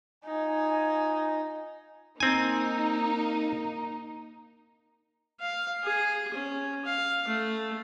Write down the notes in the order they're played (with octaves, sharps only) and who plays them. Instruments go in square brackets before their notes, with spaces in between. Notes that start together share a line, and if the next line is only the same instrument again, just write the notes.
[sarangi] D#4 [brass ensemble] F4 D#5 G#5
[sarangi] A#3 [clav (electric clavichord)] C4 G#5 [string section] D#4
[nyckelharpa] F5
G#4
C#4
F5
A3